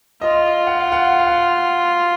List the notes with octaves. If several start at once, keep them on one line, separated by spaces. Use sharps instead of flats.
F4 D#5
F#5
F5
F#5
F#5
F5
F#5